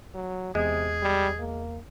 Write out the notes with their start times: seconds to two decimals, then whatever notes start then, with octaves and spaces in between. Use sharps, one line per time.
0.14 F#3
0.55 E2 C3 G#3 G#4
1.03 G3
1.39 A#3